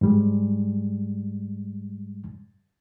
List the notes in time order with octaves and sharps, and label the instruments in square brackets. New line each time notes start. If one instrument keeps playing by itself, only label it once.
[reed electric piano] G#2 G3 G#3